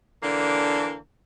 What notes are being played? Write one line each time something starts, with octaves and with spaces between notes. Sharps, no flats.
D3 E3 A#3 D4